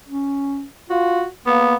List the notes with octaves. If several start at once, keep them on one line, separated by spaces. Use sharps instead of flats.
C#4
F4 F#4
A#3 B3